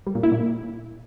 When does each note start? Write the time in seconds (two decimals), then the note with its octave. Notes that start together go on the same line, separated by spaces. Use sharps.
0.07 G3
0.15 A#2
0.23 E4
0.32 A#2